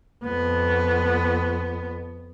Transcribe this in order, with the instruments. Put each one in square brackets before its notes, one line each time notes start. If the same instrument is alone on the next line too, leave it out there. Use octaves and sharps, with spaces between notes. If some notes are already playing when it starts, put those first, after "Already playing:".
[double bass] F2 B3